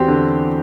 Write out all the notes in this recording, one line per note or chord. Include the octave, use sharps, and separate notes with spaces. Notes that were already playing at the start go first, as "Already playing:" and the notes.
Already playing: E2 C4 F#4 G4
D3